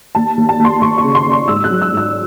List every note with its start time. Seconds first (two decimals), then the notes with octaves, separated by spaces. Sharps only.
0.15 D#2 A5
0.37 D#2
0.49 A5
0.59 D#2
0.65 C6
0.81 D#2 C#6
0.98 C#6
1.03 C#3
1.15 C6
1.25 C#3
1.32 C#6
1.48 G#2 E6
1.64 F#6
1.70 F#3
1.82 E6
1.92 G#2
1.97 E6